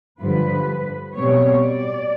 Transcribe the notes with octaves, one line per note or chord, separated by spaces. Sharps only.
G2 D3 F3 B4
B2 G3 C4 C#5
D5